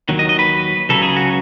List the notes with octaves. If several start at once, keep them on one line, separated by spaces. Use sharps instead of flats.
D#2 D#3 F#3
D#5
D#5
B4
C#2 C#3 F#3 A4
G#4
F#4